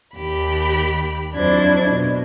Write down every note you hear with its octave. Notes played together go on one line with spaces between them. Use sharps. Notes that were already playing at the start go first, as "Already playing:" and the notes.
D#2 G4 B5
F2 F#3 D4 E4 C5 G#6
B2